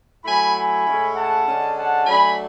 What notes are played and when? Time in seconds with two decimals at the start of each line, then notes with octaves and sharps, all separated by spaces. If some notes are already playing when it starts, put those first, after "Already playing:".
0.24 F#3 A3 E4 G#5 B5
0.55 G#5 B5
0.85 A2 G#3 C#4 E4
1.15 F#5 A5
1.45 D3 G#3 C#4
1.76 F#5 A5
2.05 F#3 A3 D4 G#5 B5